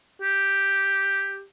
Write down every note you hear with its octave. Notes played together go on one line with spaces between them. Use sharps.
G4